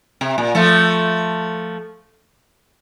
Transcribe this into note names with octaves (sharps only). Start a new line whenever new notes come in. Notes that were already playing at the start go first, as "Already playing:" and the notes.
C3
A#2
F3 A3